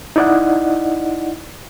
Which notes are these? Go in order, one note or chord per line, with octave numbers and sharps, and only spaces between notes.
D#4 E4 D5 D#5 F#5